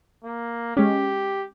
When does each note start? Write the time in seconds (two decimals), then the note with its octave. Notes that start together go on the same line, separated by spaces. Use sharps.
0.24 A#3
0.77 G#3 C#4 G4